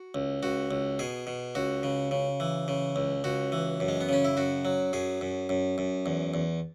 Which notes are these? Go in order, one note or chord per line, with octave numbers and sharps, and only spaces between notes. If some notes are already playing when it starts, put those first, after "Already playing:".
Already playing: F#4
C#2
C#2 F#4
C#2
B2 G#4
B2
C#2 F#4
C#3
C#3
E3
C#3
C#2
C#2 F#4
E3
F#2
G#3
B3
C#3 C#4
E4
F#2 F#4
F#3
F#2 G#4
F#2
F#2
F#2
E2
E2